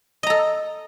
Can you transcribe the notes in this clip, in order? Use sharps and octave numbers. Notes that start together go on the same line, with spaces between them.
A4 D#5 A#5